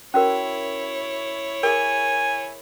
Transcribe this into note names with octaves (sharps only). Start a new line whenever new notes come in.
C#4 E4 F#4 A#4 C#5
G#4 A#4 G#5